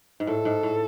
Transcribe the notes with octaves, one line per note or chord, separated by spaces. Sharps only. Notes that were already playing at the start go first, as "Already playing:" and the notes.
G#2
A2 A4
G#2
A2